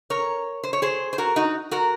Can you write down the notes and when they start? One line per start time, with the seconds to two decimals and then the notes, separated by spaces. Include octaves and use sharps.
0.10 A#4 C#5
0.63 C5
0.73 C#5
0.82 G#4 C5
1.13 C5
1.18 F#4 A#4
1.36 D#4 F#4
1.71 F#4 A#4